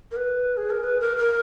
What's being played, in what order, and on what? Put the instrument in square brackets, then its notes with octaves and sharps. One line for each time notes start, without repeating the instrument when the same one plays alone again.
[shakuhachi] A#4
B4
G#4
A#4
B4
A#4
A#4